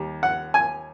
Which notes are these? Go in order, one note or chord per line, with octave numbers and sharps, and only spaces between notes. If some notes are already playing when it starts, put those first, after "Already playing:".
Already playing: D#2 G3
F#5
G#5